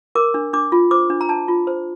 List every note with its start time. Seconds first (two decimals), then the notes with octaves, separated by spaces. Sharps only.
0.15 A#4 D6
0.34 D4
0.53 D4 D6
0.72 F4
0.91 C5 D6
1.10 D4
1.21 A#5
1.29 D4 A5
1.48 F4
1.67 C5